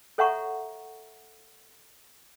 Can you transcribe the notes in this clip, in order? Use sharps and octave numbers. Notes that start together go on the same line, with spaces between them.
A4 C#5 E5 F#5 A#5 C#6